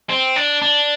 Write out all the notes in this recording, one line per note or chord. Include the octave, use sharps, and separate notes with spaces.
C4
D4
D4